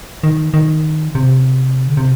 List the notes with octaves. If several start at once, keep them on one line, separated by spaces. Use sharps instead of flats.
D#3
D#3
C3
D3
C3